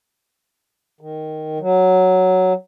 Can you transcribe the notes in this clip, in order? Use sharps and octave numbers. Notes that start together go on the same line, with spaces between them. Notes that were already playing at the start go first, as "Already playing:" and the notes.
D#3
F#3